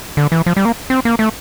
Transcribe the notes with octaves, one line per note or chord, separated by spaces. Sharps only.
D3
E3
F3
G3
A#3
C4
A#3
A3